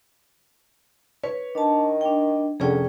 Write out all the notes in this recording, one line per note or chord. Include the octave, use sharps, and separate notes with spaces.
B4 C#5
D#3 D4 A5
D4 G5
F1 D3 C#4 G#4 C#5 G5